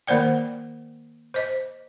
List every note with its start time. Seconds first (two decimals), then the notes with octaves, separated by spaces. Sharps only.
0.07 D#3 A#3 C5 D5 G5
1.34 C5 D#5